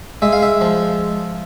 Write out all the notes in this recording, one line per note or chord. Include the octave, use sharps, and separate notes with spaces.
G#3 E5
F5
E5
F3